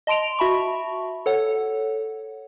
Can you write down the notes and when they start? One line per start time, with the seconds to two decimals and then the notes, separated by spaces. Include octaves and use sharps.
0.07 D#5 A5 C6 D7 F7
0.39 F#4 E5 A5 B5 C#6
1.26 A4 C#5 F#5